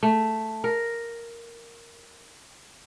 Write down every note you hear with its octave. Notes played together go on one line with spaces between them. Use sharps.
A3
A#4